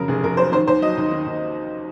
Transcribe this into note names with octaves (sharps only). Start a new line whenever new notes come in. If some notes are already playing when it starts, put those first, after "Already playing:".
Already playing: F2 C#3 F#3 A#4
F1 G#4
F2 A#4
F#3 C5
D#3 C5
D#2 C5
F#3 D#5
D#2
D#3
D#2